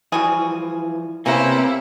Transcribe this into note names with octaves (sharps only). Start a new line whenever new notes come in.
E3 F3 G3 F#4 G#4 G#5
C3 A#3 B3 C#4 E4 F#5 A#5